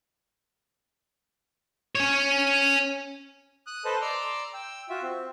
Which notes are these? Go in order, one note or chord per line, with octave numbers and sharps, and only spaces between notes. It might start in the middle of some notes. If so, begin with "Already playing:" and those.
C#4 C#5
D#6 F#6
A4 B4 C5 D#5 A5
D5 A#5 C6 D6 E6
G5 E6
F4 F#4 E5
C4